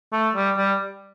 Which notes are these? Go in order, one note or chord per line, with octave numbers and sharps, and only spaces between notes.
A3
G3
G3